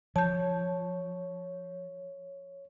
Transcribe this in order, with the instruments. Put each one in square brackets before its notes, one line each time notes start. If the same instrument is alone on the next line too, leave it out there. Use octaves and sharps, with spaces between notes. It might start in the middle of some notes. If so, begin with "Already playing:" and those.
[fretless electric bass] F3 [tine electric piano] C#5 [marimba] A5 G6